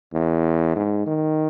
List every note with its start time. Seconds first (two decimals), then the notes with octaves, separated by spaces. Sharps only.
0.14 E2
0.76 G#2
1.07 D#3